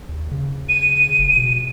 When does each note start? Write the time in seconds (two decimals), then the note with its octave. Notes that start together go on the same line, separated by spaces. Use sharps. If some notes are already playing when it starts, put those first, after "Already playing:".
0.09 D#2
0.31 C#3
0.69 D#7
1.19 F#1
1.37 B2